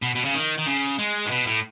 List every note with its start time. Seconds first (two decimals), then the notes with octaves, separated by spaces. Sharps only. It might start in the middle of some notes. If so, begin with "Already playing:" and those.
0.02 B2
0.15 B2
0.25 C#3
0.34 D#3
0.58 D#3
0.66 C#3
0.99 G#3
1.26 A2
1.31 B2
1.47 A2